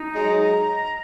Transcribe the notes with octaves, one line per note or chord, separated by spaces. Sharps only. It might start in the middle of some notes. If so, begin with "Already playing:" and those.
Already playing: D#4
F#3 G#3 A#5
A#5